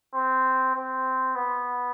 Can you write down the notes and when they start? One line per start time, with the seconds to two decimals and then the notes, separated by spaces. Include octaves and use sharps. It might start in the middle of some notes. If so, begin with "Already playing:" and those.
0.15 C4
0.75 C4
1.35 B3